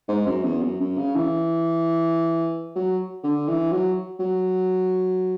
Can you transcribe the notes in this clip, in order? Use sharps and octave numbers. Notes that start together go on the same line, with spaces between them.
G#2
F#2
E2
F#2
F#2
C#3
E3
F#3
D3
E3
F#3
F#3